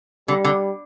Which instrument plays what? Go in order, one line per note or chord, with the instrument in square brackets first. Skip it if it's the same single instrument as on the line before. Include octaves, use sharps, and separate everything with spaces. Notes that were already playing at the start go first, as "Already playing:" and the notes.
[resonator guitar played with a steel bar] D3 [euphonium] G3
[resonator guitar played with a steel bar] D3